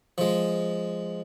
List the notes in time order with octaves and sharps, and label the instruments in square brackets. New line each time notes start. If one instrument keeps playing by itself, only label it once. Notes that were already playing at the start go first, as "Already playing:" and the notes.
[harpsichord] F3 G#3